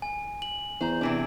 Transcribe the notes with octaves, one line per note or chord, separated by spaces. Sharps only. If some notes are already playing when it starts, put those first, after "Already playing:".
G#5
F#7
E2 C5 A#5
C3 E3 D4